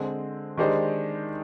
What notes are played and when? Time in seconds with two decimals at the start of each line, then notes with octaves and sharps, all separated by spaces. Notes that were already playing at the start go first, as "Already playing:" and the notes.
Already playing: D3 G#3 C4
0.57 D#3 G#3 D4 G4 C5